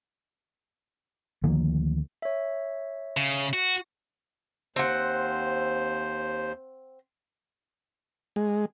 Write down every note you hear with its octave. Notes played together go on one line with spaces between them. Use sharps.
D2 D#3 F3 A#3
C#5 E5
C#3
F#4
D#2 C4 C5 F#5
G#3